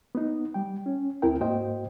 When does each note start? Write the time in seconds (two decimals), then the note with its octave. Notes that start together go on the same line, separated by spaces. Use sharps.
0.15 B3 D#4
0.54 G3 G5
0.86 C#4
1.22 D2 C4 E4 A#4 G5
1.40 G#2 A#3 F#4 C5 D#5 G5